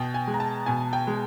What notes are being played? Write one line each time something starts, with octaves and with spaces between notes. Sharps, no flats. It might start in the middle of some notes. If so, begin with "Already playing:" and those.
Already playing: B2 G5
G#5
G#3
A#5
A5
B2 G#5
G5
G#3